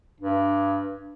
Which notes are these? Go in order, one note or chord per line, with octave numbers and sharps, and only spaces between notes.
G2